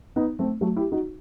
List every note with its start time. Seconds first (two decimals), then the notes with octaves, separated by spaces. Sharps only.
0.16 B3 D#4
0.39 A3 C4
0.61 F#3 A3
0.76 E4 G4
0.92 D#4 F#4